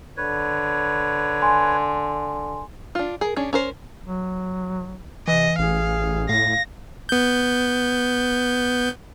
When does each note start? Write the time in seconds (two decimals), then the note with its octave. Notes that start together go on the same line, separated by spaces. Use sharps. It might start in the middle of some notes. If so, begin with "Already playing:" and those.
0.17 D3 B4 C#5
1.42 G#5 C6
2.95 D4 F4
3.21 G#4 A#4
3.36 C#4 D4 G#4
3.53 C#4 A#4 C5
4.04 F#3
5.28 C3 E3 D#5
5.59 A1 G#4 F5
6.29 A2 F5 A#6
7.09 B3 G6